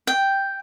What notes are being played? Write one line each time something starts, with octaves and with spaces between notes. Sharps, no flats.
G5